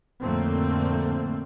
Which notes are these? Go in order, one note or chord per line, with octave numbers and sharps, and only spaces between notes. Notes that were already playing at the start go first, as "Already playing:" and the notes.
F2 A2 D3 A3 A#3 C4